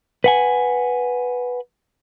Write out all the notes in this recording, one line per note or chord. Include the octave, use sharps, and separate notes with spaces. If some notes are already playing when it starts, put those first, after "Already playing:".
B4 F#5 G#5